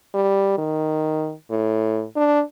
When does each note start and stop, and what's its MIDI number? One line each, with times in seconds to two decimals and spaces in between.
0.14 0.54 55
0.58 1.33 51
1.51 2.04 45
2.16 2.42 62